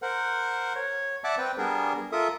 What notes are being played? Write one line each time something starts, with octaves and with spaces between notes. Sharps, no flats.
A#4 C5 F#5
C#5
D5 E5 F#5 A5 D6
C4 B4 G5
G3 B3 D4 G#4 A#4
F4 A4 A#4 E5 D#6